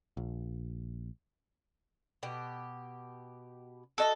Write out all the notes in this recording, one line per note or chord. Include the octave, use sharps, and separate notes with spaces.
A#1
B2 G4
F#4 A4 D#5 E5